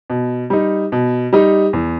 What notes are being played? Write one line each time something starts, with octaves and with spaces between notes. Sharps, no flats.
B2
G3 D#4
B2
G3 D#4
E2